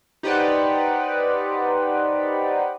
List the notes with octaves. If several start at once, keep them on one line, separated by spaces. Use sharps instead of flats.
D#4 G4 B4 C5 D5 F#5